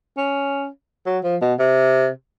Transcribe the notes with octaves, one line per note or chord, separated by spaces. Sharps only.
C#4
F#3
F3
B2
C3